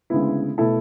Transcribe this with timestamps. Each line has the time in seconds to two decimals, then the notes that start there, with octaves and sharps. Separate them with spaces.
0.10 D2 C#3 G#3 B3 E4
0.58 B2 A3 E4 A4